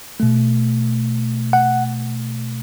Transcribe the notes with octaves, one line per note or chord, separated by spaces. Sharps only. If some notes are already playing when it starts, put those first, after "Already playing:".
B2 A3
F#5